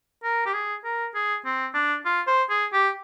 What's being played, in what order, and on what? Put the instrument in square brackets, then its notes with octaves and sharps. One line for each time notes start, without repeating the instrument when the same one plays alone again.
[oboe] A#4
G4
G#4
A#4
G#4
C4
D4
F4
C5
G#4
G4